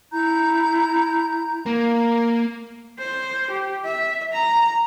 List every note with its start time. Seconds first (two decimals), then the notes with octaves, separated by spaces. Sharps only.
0.12 E4 A#5 G6
1.66 A#3
2.99 C5
3.51 G4
3.85 E5
4.33 A#5